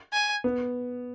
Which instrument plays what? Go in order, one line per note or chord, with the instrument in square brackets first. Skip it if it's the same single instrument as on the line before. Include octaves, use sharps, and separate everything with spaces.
[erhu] G#5
[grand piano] B3